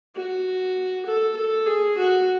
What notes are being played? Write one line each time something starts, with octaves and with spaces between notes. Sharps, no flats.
F#4
A4
A4
G#4
F#4